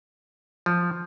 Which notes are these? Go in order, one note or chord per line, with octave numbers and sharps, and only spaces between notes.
F3